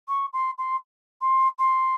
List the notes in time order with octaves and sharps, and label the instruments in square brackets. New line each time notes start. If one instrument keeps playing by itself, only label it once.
[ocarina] C#6
C6
C6
C6
C6